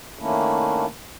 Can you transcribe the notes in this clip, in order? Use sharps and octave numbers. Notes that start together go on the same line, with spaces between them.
D#3 A3 A#3 C#4 D4 E4